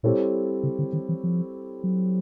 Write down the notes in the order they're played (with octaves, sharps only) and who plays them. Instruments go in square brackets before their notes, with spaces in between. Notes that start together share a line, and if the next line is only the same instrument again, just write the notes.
[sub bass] A#2 [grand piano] G3 C4 E4 A4 C#5
[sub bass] C#3
D3
D#3
E3
F3
F#3